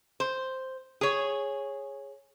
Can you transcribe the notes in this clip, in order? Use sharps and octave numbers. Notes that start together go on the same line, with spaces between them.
C5
G#4 C#5